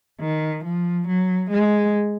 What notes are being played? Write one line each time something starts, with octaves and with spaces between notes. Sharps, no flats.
D#3
F3
F#3
G#3